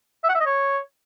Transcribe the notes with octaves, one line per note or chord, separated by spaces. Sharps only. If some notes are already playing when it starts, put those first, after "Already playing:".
E5
F#5
E5
D#5
C#5